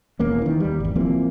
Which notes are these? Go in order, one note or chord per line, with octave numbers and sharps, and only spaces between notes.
E1 E2 A#3 C#4
D#3 E3
D#2 G3
G#1 E2
E3 F3 A#3 C4